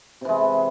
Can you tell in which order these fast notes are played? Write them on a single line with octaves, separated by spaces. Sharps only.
C3 E3 G#3